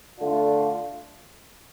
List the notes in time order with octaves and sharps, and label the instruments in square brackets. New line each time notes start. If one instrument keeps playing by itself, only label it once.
[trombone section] D3 A3 D4 F4